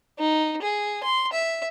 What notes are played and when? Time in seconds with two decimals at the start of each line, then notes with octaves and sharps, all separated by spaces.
0.19 D#4
0.62 G#4
1.03 C6
1.32 E5